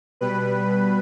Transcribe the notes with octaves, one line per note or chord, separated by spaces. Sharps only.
B2 G3 B4